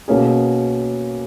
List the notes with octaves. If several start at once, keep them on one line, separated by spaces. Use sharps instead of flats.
B2 A#3 C#4 G#4